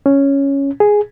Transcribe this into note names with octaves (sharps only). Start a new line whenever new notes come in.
C#4
G#4